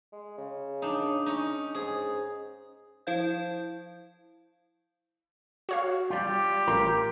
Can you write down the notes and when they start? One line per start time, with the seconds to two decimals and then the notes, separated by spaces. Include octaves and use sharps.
0.12 G#3
0.38 C#3
0.82 D4 D#4
1.26 C#4 D#4
1.75 G#2 G#4
3.07 F3 E4 C5 F5 G6
5.69 F#4 C#5 F5
6.10 G3 F4 G4
6.67 A1 F4 A#4